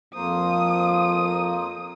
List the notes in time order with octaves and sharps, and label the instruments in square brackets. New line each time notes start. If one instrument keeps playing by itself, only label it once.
[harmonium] F2 A#3 C5 [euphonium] F3 [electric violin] D#6